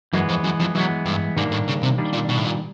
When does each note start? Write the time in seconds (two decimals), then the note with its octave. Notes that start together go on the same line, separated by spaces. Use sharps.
0.13 F#2 E3 G#3 B3
0.29 F2
0.44 F#2
0.60 F2
0.75 F#2 E3 G#3 B3
1.06 G2
1.37 G#2 D#3 G3 A#3 D4
1.52 A2
1.68 C#3
1.83 C3
1.98 D#3 G3 A#3 D4
2.13 A#2
2.29 B2
2.37 A2
2.45 A#2